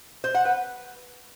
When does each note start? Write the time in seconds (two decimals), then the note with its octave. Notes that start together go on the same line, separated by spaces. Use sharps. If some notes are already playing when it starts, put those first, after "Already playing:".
0.24 C5
0.35 F#5
0.45 B4